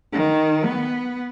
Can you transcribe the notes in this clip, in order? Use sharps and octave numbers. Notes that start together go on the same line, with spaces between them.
D#3
B3